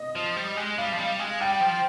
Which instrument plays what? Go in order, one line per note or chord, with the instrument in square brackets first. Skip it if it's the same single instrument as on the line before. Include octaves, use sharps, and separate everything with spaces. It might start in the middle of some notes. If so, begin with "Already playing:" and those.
Already playing: [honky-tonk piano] D#5
[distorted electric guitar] F3
G3
G#3
[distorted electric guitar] G3 [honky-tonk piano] F5
[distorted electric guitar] F3
G3
G#3
[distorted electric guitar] G3 [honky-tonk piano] G5
[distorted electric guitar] F3